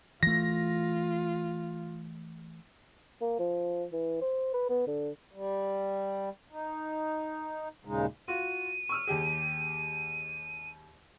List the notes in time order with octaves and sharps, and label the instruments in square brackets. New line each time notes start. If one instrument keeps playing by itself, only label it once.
[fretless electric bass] E3 A3 [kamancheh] F4 [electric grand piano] A#6
[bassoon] A#3
F3
E3
C5
B4
B3
D3
[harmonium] G3
D#4
D#2 A#2 C#3 G#3 D#4
[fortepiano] F4 F#4 [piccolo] D#7
[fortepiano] C#6 E6 F6
D#2 G4 G#4